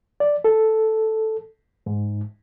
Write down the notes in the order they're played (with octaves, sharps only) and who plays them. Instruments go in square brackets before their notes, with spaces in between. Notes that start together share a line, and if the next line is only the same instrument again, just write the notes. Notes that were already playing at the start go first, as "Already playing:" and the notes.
[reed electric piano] D5
A4
G#2